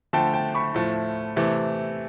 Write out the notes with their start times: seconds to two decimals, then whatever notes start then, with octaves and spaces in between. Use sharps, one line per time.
0.13 D3 F3 A3 G5 A5
0.33 G5 A5
0.55 B5 C#6
0.74 A2 F3 A3
1.36 C3 E3 A3